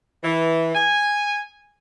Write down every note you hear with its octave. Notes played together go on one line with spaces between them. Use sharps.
E3
G#5